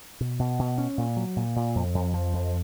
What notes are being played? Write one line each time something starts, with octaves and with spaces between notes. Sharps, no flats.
B2
B2
B2
C#4
A#2
F#3
A#2
A#2
F2
F2
F3
F2